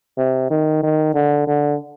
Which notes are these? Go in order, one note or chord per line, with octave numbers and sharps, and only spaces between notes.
C3
D#3
D#3
D3
D3